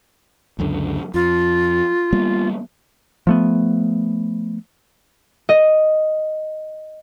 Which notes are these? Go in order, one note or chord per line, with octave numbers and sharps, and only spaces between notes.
C#2 F#2 D3
F2 F4
G3 A#3 B3
F3 A3 B3
D#5